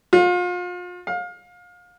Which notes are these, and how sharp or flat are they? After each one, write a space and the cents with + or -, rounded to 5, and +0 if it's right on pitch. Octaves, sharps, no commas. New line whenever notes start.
F4 +35
F5 +30